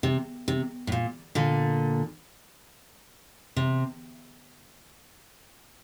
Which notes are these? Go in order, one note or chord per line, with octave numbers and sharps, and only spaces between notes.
C3
C3
A2
A#2
A#2 D3
C3